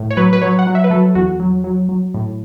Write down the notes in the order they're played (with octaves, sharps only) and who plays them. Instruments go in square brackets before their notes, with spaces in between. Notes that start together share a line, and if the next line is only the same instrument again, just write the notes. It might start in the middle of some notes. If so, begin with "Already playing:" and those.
Already playing: [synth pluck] A2
C#5
F#3 B4
B4
F#3 C#5
F#5
F#3
E5
B4
F#3 A4
E2 F#4
F#3
F#3
F#3
A2